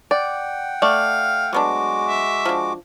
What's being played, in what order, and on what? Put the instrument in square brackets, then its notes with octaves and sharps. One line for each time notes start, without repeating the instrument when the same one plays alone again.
[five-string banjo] D5 [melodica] F#5 G5
[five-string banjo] A3 [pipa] D5 [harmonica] F5
[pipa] F#3 B3 D4 [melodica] G#3 F#4 D6
[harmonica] E5
[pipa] F3 D4